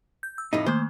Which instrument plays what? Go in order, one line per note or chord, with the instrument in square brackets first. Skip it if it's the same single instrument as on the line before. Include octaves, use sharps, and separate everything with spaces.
[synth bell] G6
E6
[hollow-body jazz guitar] F2 A2 D#4
[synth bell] D#3 A3 A#3 [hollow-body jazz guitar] C5